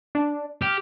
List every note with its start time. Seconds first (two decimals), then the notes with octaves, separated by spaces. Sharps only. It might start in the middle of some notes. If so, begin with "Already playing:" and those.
0.15 D4
0.62 G4 F6